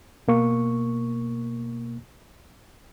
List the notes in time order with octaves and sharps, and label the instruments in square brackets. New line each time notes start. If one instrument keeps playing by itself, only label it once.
[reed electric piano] B2 A#3 C#6